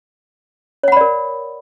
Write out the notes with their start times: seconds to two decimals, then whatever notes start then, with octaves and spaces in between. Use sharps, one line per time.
0.83 C#5
0.88 F#5
0.92 B5
0.96 D5
1.01 A#4